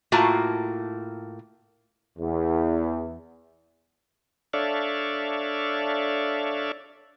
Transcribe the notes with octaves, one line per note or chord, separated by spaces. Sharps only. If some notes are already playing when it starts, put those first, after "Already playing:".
A2 A#3 F4 F#4 A5 A#5
E2
D4 A4 C#5 D5 E5 F5